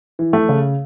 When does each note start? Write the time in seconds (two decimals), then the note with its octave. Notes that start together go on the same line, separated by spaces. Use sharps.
0.19 E3
0.33 A3
0.49 C#3